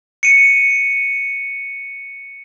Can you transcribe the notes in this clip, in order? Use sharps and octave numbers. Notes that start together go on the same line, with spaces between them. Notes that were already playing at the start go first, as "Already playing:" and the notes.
C#7 D#7